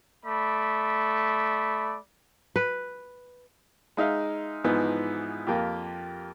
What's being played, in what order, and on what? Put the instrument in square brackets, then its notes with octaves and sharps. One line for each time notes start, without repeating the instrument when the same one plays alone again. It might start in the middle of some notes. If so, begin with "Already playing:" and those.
[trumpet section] A3 D5 B5
[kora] B4
[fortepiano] G#3 D#4 E5 F5
G#2 E3 F3 B3 D#4
F2 A#3 F4 G4